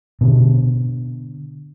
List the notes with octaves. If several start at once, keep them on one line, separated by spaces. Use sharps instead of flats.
B2 D3